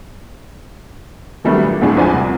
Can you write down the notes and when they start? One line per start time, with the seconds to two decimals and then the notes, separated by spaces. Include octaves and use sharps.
1.44 D#3 F#3 G3 A3 B3 D4
1.63 A#2
1.81 D2 A2 G#3 D4 F4 G#5
1.97 E2 F3 D4 D5 G#5
2.14 C2